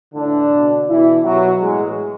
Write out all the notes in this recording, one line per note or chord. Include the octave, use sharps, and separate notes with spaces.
A2 D3 E3 D4
B2
B2 E3 E4
B2 F#3 F#4
A2 E3 G#3 G#4